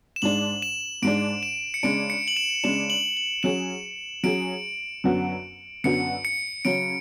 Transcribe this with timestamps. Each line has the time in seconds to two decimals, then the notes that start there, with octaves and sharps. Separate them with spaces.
0.16 E7
0.22 G#2 G#3 D4 F#7
0.62 E7
1.02 G#2 G#3 D4 D7
1.43 E7
1.74 C#7
1.83 C#3 G#3 D4 D7
2.10 C#7
2.28 F#7
2.37 E7
2.64 C#3 G#3 D4 E7
2.90 F#7
3.17 F#7
3.43 F#3 C#4 G#4 E7
4.23 F#3 C#4 G#4 D7
5.04 F#2 D3 F#3 B3 F#4
5.84 F#2 D3 F#3 B3 F#4 C#7
6.25 C#7
6.65 C#3 F#3 C#4 D7